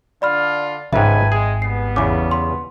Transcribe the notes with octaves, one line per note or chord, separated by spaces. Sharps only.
D3 D4 F4 D5 B5 F6
G#1 C#2 G#2 A4 B4 E5 G5 G#5
G#3 G#4
G3 B3 C7
E2 C#3 D6
C6